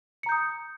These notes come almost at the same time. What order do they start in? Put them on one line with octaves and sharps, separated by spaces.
C#7 A#5 G6 D#6